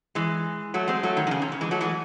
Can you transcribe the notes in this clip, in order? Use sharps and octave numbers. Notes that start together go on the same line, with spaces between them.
E3 G#3
F#3 A3
G#3 C4
F#3 A3
D#3
D#3
C#3
C3
C#3
E3 G#3
F#3 A3
E3 G#3